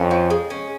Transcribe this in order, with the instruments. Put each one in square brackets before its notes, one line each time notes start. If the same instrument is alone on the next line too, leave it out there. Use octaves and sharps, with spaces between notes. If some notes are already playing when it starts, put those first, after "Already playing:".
Already playing: [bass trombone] F2 [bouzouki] C#4
[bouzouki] F3
G#3
C#4